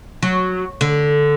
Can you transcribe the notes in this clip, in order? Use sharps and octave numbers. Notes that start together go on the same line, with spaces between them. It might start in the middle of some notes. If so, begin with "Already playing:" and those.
F#3
D3